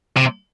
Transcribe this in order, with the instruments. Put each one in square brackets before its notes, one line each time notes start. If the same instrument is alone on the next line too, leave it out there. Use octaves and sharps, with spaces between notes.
[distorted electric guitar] C3